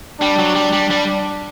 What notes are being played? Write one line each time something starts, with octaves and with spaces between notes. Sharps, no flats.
G3 D4
F#3
G3
G3
G3